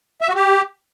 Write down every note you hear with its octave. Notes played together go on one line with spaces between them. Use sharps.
E5
F#4
G4